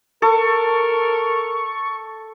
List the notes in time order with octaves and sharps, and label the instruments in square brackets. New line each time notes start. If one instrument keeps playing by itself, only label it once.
[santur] A4 [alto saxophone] A#4 [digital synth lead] C#6